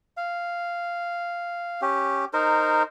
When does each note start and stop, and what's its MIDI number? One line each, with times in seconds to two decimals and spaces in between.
0.17 1.81 77
1.82 2.25 61
1.82 2.25 67
2.33 2.83 63
2.33 2.83 70
2.33 2.83 72